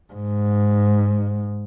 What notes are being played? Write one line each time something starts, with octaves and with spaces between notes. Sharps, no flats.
G#2